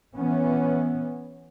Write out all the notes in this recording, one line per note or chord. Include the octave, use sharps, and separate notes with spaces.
E3 B3 C#4